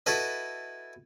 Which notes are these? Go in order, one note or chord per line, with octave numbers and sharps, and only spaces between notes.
E4 F#4 A4 B4 D#5